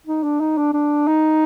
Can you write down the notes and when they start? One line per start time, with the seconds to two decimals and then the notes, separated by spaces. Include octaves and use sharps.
0.07 D#4
0.23 D4
0.41 D#4
0.58 D4
0.74 D4
1.08 D#4